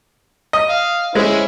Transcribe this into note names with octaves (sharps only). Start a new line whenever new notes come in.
D#5
F5
G#3 C#4 E4 C5